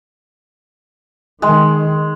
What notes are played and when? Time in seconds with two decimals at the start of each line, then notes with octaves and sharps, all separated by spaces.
1.42 D#3 G#3